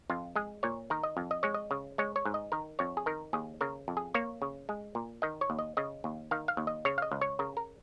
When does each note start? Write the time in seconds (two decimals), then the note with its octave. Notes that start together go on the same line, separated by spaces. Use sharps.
0.10 F2 F4
0.36 G#3 G#4
0.63 A#2 C#5
0.90 D#3 A#4
1.03 D#5
1.17 F2
1.31 D#5
1.43 G#3 C#5
1.54 D#5
1.71 C#3
1.98 G#3 C#5
2.16 C#5
2.25 G#2
2.34 D#5
2.52 D#3 A#4
2.79 F2 C#5
2.97 G#4
3.06 D#3 A#4
3.33 D#2 G#4
3.61 C#3 A#4
3.88 F2
3.97 G#4
4.14 A#3 C#5
4.42 C#3
4.69 G#3
4.95 A#2
5.22 D#3 D#5
5.41 C#5
5.50 D#2
5.59 D#5
5.77 C#3 D#5
6.04 D#2
6.31 D#3 F5
6.48 F5
6.57 D#2
6.67 D#5
6.85 C#3 C#5
6.98 F5
7.02 D#5
7.11 C#2
7.21 C#5
7.39 C#3 A#4
7.57 A#4